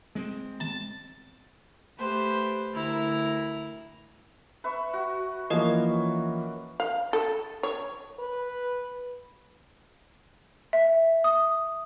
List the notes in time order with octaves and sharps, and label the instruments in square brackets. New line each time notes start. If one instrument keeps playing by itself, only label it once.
[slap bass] G#3 B3 C4
[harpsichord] A5
[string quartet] A3 G4 B4 C5
D2 E4 A#4 A#5
[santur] B4 E5 C#6
F#4
[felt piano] E3 F3 A#3 [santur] C#4 [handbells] A#4 D#5
[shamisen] F5
A4
C#5
[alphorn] B4
[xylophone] E5
D#6